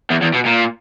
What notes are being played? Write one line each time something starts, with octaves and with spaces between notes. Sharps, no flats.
E2
E2
B2
A#2